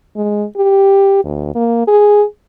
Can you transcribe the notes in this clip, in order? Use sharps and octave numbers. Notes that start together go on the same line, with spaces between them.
G#3
G4
D2
A#3
G#4